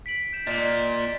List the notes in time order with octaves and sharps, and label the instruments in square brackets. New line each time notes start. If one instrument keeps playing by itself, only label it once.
[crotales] B6 D7 F#7
G6 E7
[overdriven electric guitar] A#2 [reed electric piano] D5 D#5 [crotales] A6